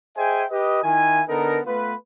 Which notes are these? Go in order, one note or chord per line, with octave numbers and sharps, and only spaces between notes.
G#4 C5 D#5 E5 G5 G#5
G4 B4 D#5
D#3 E4 G#5
D3 B3 D#4 A4 A#4
A3 B3 F4 B4